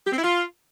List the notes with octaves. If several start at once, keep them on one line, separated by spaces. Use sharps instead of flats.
G4
C4
E4
F4